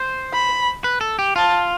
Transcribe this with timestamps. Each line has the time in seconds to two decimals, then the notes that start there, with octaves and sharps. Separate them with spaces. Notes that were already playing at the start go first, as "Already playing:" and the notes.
Already playing: C5
0.33 B5
0.84 B4
1.01 A4
1.19 G4
1.36 F4 A5